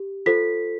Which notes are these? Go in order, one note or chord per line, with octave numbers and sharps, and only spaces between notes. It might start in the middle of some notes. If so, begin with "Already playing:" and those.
Already playing: G4
F4 A4 C5 B6